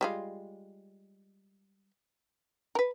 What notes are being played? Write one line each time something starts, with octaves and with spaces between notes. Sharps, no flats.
G3 G#3 F4
A#4 B4